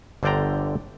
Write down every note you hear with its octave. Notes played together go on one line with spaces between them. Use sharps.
G1 D3 C5 D5 G5 A#5